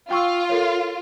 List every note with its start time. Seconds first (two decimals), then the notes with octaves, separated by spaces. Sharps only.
0.11 F4 G5 C#6 E6
0.49 A4 A#4 C#5